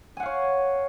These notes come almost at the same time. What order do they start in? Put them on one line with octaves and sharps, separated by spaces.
G#5 F#5 F5 C#5